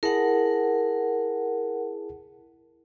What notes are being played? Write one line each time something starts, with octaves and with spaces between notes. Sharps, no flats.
E4 G#4 A#4 F#5 A5